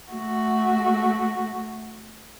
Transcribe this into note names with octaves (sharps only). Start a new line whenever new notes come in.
A3 F#4